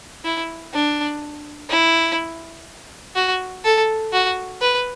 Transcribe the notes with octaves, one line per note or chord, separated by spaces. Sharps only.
E4
D4
E4
F#4
A4
F#4
B4